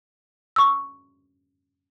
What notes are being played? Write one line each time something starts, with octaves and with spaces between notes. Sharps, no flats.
C#6 E6